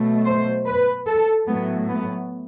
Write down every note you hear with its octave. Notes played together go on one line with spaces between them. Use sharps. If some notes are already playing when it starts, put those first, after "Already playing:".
Already playing: B2 F#3 A3
C5
B4
A4
A2 F#3 A3 B3
B3